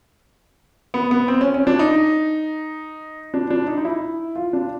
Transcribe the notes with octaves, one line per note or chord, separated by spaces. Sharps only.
B3
B3
C4
C#4
C#4
D4
D#4
D4
D4
D#4
D#4
E4
F4
D4